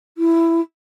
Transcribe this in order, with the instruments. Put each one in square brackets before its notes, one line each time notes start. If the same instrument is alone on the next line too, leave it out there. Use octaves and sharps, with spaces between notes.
[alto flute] E4